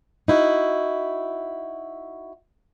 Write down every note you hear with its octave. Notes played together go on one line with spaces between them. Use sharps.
D#4 E4 F#4